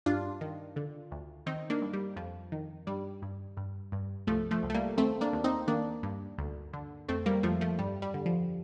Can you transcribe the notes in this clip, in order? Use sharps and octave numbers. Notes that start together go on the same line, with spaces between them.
G2 D4 F4
D#3
D3
D2
D#3 C4 D#4
A#3 D4
G2
G3
F2 F3
D#3
G2 G3
G2
G2
G2
C2 F3 A3
F3 A3
C2
A3
G3 A#3
D#2 A3 C4
A#3 D4
D#2
C4 D#4
D#3 A#3 D4
G2
D2
D3
F2 A3 C4
G3 A#3
F2 F3 A3
F3 A3
G2 G3
G3
D3
F3